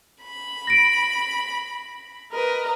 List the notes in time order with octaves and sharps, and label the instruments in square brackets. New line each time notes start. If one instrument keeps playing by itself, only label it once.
[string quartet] B5
[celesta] A#6 D7
[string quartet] A#4 B4 D#5